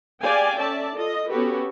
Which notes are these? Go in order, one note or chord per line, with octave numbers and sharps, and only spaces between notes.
G4 G#4 D5 F5 G5 G#5
C#4 A4 D5 E5 A5
F4 A4 D#5
B3 C#4 F#4 G4 A4 B4